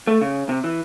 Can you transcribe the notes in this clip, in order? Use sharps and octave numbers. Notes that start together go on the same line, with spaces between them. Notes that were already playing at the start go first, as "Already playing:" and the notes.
A3
C#3
C3
E3